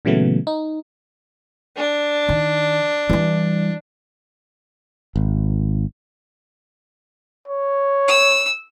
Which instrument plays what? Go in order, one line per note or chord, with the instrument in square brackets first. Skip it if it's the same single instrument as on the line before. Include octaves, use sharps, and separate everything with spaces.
[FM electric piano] A#2 C#3 E3 F#3 A3 B3
D#4
[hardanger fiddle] D4
[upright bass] D#3
E3 G3
[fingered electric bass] G#1
[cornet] C#5
[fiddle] E6